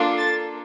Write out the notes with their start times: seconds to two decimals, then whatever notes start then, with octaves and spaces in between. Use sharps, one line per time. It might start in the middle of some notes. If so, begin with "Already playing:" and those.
Already playing: A#3 D4 F4 A4
0.18 A6